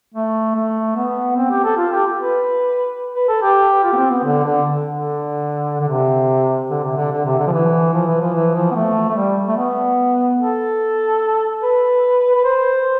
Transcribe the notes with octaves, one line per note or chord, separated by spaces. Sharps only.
A3
A3
B3
C4
G4
A4
F4
G4
B4
B4
A4
G4
F4
B3
C4
B3
D3
D3
D3
D3
C3
D3
C3
D3
D3
C3
D3
F3
E3
F3
E3
F3
E3
F3
B3
A3
A3
G3
A3
B3
A4
B4
B4
C5